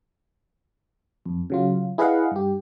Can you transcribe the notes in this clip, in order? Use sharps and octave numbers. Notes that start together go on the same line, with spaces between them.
F2
C#3 F#3 F4
E4 G#4 B4 D#5 F5 F#5
G2 G4